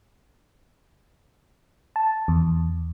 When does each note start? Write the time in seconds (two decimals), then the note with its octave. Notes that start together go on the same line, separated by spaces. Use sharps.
1.96 A5
2.28 E2